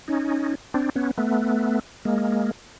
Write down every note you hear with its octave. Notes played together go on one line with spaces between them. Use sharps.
C#4 D#4
C4 D4
B3 C#4
A3 B3
G#3 A#3